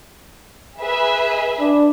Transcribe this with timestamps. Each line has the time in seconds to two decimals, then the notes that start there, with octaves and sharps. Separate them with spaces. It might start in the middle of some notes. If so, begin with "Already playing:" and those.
0.80 G#4 B4 E5
1.60 D4